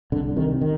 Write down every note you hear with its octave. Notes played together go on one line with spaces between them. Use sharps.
C2 D3
C3 D#3
D#3